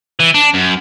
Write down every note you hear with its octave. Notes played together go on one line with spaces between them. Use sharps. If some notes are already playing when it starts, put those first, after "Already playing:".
E3
D4
F#2